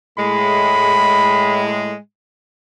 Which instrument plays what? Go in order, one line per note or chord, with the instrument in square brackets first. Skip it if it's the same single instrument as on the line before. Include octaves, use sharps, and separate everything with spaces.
[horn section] A2 G#3 [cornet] B5